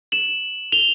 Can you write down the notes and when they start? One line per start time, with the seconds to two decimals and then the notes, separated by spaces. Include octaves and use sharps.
0.12 E7 F#7
0.72 F7 G7